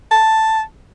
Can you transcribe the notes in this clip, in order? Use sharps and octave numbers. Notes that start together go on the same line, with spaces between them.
A5